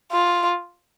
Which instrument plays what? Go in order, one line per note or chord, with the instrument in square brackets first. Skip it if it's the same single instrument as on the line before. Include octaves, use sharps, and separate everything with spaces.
[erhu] F4